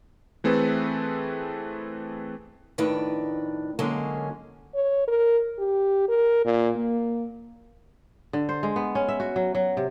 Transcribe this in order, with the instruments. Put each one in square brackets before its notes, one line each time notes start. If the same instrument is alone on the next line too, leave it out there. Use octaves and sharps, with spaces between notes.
[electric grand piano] E3 A3 C4 G#4 A4 B4
[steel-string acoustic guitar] F2 A2 D#3 D4 B4
D3 F#3 G#3 A#3 C#4
[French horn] C#5
A#4
G4
A#4
A#2
A#3
[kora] D3
C5
G#3
B3
C#4
E5
F#4
F#3
F#3
C3